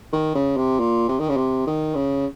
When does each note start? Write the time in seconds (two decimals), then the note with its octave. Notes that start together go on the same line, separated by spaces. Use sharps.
0.13 D#3
0.35 C#3
0.57 C3
0.79 A#2
1.09 C3
1.19 D#3
1.28 C#3
1.37 C3
1.67 D#3
1.95 C#3